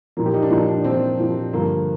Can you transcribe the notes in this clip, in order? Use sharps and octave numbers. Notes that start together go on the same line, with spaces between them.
A#2 F3 A#3
G4
D#4
D4
A#2 F3 D#4
D4
A#2 F3 C4
A#2 F3
G2 D3 F3 A#3